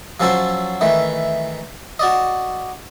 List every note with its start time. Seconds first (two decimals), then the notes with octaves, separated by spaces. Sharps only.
0.20 F3 F#3 C#4 A4 C5
0.81 D#3 E3 A3
1.99 F#4 D5 D#5